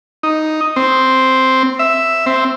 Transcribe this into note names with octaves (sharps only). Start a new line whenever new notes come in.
D#4
C4
E5
C4